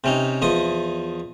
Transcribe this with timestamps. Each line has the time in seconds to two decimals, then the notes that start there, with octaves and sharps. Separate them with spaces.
0.04 C3 C#4 D#4
0.42 E2 F3 D#5 D#6